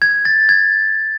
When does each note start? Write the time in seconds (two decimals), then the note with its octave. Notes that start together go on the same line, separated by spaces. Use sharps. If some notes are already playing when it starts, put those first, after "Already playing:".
0.02 G#6
0.25 A6
0.49 G#6